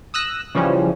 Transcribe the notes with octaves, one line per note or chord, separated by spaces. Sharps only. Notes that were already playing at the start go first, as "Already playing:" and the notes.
D#6 E6 F#6 A#6
C#3 E3 F3 G3 C#4